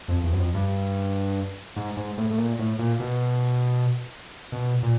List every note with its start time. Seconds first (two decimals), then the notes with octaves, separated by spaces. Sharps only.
0.08 F2
0.24 E2
0.32 F#2
0.39 F2
0.54 G2
1.76 G#2
1.97 G#2
2.18 A2
2.30 A2
2.38 A#2
2.59 A2
2.79 A#2
3.00 B2
4.52 B2
4.83 A#2